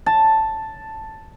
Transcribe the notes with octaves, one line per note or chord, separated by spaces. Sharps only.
A5